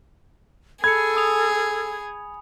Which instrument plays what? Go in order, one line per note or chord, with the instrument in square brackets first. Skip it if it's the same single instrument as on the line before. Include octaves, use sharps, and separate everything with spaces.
[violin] G#4 [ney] A4 [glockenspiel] B5 C#7 [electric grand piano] G#6
[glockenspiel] G#5 D#6 F7